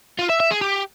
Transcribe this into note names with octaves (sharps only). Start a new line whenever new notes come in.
F4
E5
E5
G#4
G4